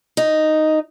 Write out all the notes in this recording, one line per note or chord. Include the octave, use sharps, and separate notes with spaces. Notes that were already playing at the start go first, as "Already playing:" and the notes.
D#4